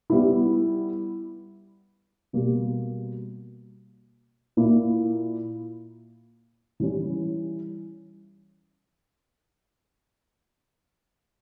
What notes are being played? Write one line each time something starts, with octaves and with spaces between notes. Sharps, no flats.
G3 B3 E4
B2 G3 A#3
A#2 A#3 E4
E3 G3 C#4